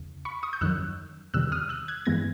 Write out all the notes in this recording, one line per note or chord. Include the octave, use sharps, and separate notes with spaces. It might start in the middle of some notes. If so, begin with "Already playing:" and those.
Already playing: E2 C#3
B5 C#6
C#6 D#6
G6
F#2 D#3 F#3 E6 F#6
E2 C3 D#3 G3 E6 F#6
D#6 F6
E6 F#6
F#6 G#6
G2 E3 G#3 B3 G#6 A#6